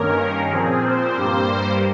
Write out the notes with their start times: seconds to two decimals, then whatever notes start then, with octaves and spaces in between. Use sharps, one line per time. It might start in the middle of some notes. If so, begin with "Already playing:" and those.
Already playing: G2 D#3 A#3 C#4 A#4
0.51 A#2 F3 C4 G#4
0.84 C5
1.17 G2 G3 A#3